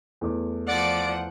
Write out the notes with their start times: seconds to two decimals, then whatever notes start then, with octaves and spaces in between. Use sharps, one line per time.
0.21 E2 A3 D6
0.67 F3 D5 F#5 D7